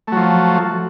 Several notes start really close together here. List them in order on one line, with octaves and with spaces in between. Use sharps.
A3 F#3 F3